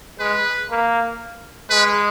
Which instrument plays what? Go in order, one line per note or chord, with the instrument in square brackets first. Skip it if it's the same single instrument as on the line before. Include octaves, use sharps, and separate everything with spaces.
[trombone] G#3 [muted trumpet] B4
[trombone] A#3
[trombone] G#3 [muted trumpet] B4